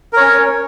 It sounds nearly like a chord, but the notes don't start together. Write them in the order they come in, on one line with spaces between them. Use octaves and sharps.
A#4 C#5 C#4